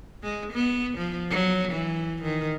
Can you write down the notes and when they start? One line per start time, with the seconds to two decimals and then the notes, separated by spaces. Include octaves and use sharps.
0.23 G#3
0.53 B3
0.98 F3
1.30 F#3
1.72 E3
2.23 D#3